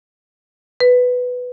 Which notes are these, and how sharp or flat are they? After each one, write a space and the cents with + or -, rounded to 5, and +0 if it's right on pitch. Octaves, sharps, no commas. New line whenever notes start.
B4 +5